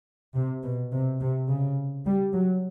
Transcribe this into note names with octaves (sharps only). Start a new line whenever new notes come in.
C3
B2
C3
C3
C#3
G3
F#3